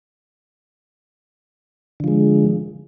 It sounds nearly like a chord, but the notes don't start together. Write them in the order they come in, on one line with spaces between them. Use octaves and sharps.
D3 F3 G#3